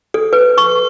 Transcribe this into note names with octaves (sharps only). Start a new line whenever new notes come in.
A4
B4
C#6